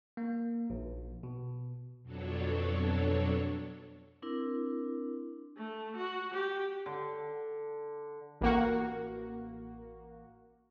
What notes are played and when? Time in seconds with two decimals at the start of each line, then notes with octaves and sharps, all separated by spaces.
0.17 A#3
0.70 A#1
1.23 B2
2.02 F2 B2 F#3 D4 A4 C#5
4.22 C4 D4 E4 A#4
5.56 A3
5.96 F#4
6.34 G4
6.86 D3
8.41 A1 A#3 F#4